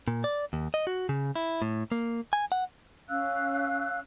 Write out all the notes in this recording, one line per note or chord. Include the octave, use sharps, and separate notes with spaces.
A#2
D5
D#2
D#5
F#4
C#3
E4
A2
A#3
G#5
F#5
C#4 F5 E6 F#6